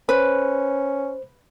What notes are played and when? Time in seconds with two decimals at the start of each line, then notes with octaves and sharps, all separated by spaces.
0.09 C#4 B4 C5